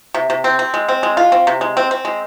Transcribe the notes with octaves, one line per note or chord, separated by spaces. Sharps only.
C3
C3
C4
C4
G#3
C4
G#3
F4
C4
C3
G#3
C4
C4
G#3